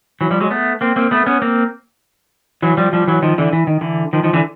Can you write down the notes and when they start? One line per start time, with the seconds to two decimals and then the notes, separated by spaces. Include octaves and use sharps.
0.21 E3 F#3
0.30 F3 G3
0.41 F#3 G#3
0.51 A3 B3
0.81 A#3 C4
0.96 A#3 C4
1.11 A3 B3
1.26 B3 C#4
1.42 A#3 C4
2.62 E3 F#3
2.77 F3 G3
2.93 F3 G3
3.07 E3 F#3
3.22 D#3 F3
3.38 D3 E3
3.53 E3
3.67 D#3
3.81 D3 E3
4.13 D#3 F3
4.23 D#3 F3
4.33 D3 E3